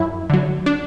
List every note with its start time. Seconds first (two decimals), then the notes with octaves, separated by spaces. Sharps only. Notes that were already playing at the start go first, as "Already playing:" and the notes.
Already playing: F#2 E4
0.30 D3 F#3
0.66 D4